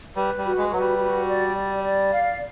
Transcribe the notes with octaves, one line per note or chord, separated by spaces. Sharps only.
G3 B4
G3
F#4
G#3
F#3 B4
G3
F#4
D5
D5
D5
F5